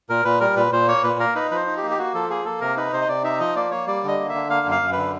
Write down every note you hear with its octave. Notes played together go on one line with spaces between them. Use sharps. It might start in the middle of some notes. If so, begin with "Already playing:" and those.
A#2 A#4
A#2 B4
G3 A#4
A#2 B4
A#2 C5
A#3 C#5
A#2 B4
A#3 A#4
D#4 B4
F3 B4 C5
D#4
G4
A#3
G4
A#3 F#4
F3 A4
A#3 G#4
A#3 A4
C3 A#4
D#4 B4
C3 C5
D#5
C3 D5
D#4 E5
F3 D#5
A#3 D5
A#3 C#5
G3 D5
D3 D#5
A#3
E5
D3
A#3 F5
F#2
F5
F#2
D3 B4